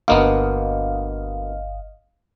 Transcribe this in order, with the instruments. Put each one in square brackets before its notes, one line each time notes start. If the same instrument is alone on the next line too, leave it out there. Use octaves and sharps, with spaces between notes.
[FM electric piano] G1 D#5 F5 [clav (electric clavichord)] D2 A#3 B3